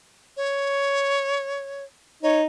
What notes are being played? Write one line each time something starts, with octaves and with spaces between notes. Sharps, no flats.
C#5
D#4 C#5